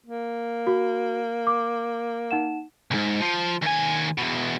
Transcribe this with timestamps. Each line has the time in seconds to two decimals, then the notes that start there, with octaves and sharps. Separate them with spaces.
0.06 A#3
0.67 F#4
1.47 D6
2.31 D#4 F#5 E7
2.91 C2 G#2
3.20 F3
3.62 D#2 G#5
4.18 E2 B2